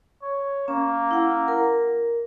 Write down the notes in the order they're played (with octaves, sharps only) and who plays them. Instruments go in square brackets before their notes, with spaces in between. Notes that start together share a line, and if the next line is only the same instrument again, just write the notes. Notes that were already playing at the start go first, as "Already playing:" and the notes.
[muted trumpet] C#5
[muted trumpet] A#3 [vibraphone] C#4
[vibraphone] E4 F#5
A#4